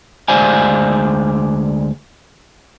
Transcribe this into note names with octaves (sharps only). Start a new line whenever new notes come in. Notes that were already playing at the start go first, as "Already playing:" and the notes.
D2 G#3 C5 D5 F5 G#5